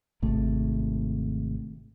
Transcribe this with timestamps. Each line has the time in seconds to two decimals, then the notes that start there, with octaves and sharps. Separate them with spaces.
0.22 G#1 C3 A3